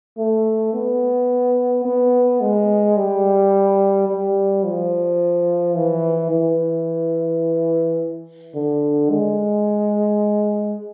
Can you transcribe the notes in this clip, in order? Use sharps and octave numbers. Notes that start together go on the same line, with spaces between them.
A3
B3
B3
G#3
G3
G3
F3
E3
E3
D3
G#3